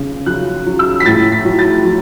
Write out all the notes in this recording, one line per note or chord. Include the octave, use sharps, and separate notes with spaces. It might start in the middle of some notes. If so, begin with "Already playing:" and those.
Already playing: C#3
F#3 F#6
F#3
E6
B6
A2 A6
B6
F#3
A6
F#3